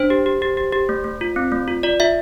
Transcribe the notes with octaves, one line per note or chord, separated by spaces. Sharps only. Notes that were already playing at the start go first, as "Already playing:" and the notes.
Already playing: D4 C5
G4
G4
G4
G4
G4
A3
A3
F4
C4
A3
F4
F4 D5
F4 E5